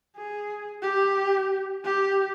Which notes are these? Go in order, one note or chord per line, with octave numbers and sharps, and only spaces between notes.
G#4
G4
G4